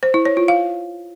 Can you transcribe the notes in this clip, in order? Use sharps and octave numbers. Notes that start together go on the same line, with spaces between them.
C5
E4
C#5
F4
F5